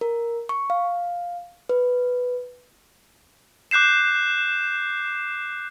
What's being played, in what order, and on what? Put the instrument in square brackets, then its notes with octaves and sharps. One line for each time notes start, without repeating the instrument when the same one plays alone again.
[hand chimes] A#4
C#6
F5
B4
[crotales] D6 F#6 G6 C7 E7